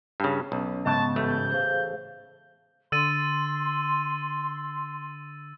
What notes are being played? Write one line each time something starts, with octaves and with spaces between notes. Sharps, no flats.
G2 C#3
B1 C#4
C#2 G#2 C#3 B3 A5
A1 A3 G6
G#4 C5 F5
D3 C6 E6 A6 D#7